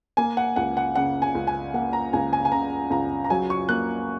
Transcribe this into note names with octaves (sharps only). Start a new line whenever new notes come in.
A#3 G#5
F#5
C#2 F#5
F#5
C#3 F#5
G#5
C#2
G#5
A#3 F#5
A#5
C#2 G#5
G#5
G#5
C#3 A#5
C#2 A#5
A#5
F#3 G#5
C#6
A#3 F#6